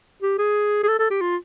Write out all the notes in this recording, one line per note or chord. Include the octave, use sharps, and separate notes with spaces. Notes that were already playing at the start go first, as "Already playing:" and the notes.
G4
G#4
G#4
A4
A4
G4
F4